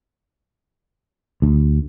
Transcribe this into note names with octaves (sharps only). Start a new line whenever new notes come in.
D2